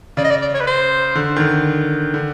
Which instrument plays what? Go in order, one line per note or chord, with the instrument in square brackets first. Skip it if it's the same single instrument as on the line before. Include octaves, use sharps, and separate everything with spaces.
[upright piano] C#3 [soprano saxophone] D5
[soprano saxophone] D#5
D5
D5
C#5
B4
C5
[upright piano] D3
D#3
D3
D3